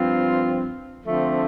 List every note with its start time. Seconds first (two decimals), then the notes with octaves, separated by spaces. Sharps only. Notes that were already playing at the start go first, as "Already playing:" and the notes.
Already playing: G2 F3 C4 F4
1.03 D3 F3 A3 C4